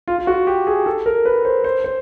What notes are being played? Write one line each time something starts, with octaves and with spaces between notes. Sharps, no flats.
F4
F4
F#4
G4
G#4
A4
A#4
B4
C5
C5
C5